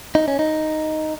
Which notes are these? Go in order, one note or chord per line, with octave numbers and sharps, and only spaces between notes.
D#4
C#4
D#4